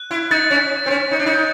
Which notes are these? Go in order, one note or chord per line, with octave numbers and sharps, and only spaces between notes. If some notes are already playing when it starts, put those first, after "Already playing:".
Already playing: F#6
E4
D#4 A6
C#4
C4
C#4
D#4
D4
D#4